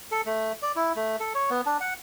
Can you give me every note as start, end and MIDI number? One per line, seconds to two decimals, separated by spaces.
0.12 0.21 69
0.26 0.53 57
0.62 0.72 74
0.76 0.93 64
0.96 1.16 57
1.20 1.33 69
1.35 1.50 73
1.50 1.61 59
1.66 1.77 62
1.81 1.94 78